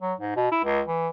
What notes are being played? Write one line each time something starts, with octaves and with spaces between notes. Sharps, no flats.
F#3
G#2
B2
E4
C#2
E3